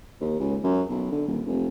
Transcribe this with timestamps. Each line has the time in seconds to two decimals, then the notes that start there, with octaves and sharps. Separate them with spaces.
0.21 D#2
0.40 C#2
0.63 F#2
0.89 B1
1.12 D3
1.27 D#1
1.46 F1